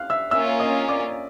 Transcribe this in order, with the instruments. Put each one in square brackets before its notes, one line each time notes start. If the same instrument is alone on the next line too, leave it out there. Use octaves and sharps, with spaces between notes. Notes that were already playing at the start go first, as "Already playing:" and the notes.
Already playing: [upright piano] F5 F6 F#6
E5 E6
[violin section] A#3 C#4 F4 [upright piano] E5 E6
[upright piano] D#5 D#6
D5 D6